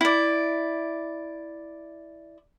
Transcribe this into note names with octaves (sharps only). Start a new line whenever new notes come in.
E4 D5